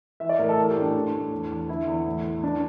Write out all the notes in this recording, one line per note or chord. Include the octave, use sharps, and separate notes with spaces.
E3 E5
D5
A2 A#4
A4
E3 A#4
G4
A2
D4
E3
A2
E2
E2
D3 E4
E2
A2
A2
E3 D4